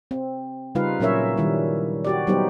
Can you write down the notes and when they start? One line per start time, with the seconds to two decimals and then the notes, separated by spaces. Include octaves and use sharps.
0.11 C4
0.75 C#3 G3 D#4 F4 B4 F5
1.00 A#2 F#3 C#4 A#4 C#5 E5
1.37 D#3 G3 E4
2.05 F#4 G4 D5
2.27 F#3 G3 B3 D#4 G4 C5